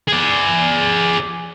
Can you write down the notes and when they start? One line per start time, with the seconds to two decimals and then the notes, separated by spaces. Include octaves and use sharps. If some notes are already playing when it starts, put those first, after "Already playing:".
0.08 G#4 D5